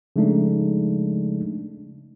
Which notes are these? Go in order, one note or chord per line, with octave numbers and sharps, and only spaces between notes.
C#3 F3 G#3 A3 D4 D#4